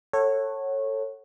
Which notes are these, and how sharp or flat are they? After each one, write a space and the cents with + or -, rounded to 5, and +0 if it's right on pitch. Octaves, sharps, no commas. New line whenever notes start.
A4 +15 C#5 -15 F#5 +10